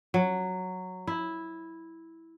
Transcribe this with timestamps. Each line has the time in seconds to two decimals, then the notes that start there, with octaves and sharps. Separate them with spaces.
0.14 F#3
1.07 E4